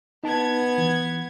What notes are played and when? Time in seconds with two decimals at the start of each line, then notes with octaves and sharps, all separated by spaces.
0.24 B3 D#4 A5 G#6
0.78 E3